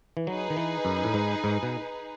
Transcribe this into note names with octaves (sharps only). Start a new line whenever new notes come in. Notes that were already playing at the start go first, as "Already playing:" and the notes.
E3
F#3 D#4 G#4 B4
D#3
E3
F#2
A2
G#2
G#2
B2